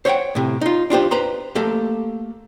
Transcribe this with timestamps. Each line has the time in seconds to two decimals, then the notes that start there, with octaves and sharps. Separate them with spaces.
0.05 C5 C#5 E5 F#5 G5
0.35 A2 C3
0.61 D#4 F4
0.90 D4 F4 G4 C5
1.11 B4 C5 A#5 C6
1.55 A3 A#3 G4 A4